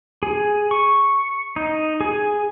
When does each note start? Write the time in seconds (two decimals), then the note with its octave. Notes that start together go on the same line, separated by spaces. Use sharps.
0.23 G#4
0.71 C#6
1.56 D#4
2.01 G#4